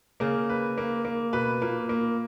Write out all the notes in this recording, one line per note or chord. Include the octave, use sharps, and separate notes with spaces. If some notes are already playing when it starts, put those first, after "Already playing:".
C#3 A#3
B4
A#3
A#3
B2 B4
A#2 A#3
A#3